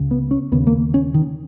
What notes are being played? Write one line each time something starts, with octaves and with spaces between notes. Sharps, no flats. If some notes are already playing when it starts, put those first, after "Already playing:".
Already playing: C#2 C#3
B3
C#4
D#2 C#3 B3
A#3
C#4
D#3